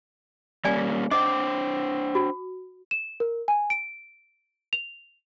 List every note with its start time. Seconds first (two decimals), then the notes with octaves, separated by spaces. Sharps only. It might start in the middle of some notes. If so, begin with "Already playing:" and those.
0.65 G3 A#3 C#4 D5 G#5
1.11 D4 C5 D#5 G5 D6
2.15 F#4
2.91 E7
3.20 A#4
3.48 G#5
3.70 D7
4.73 F7